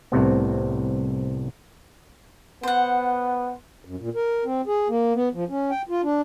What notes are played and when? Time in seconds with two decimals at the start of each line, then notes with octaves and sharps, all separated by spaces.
0.12 C2 A2 C3 B3
2.63 B3 C5 F#5
3.85 F#2
4.00 A#2
4.15 A#4
4.45 C4
4.67 G#4
4.89 A#3
5.14 B3
5.34 F3
5.49 C#4
5.71 G5
5.89 F4
6.03 D4